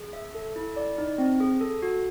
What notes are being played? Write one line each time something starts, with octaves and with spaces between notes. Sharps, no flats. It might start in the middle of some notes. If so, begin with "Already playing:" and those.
Already playing: G#4
E5
A4
E4
D5
D#4
C4
G#4
A4
F#4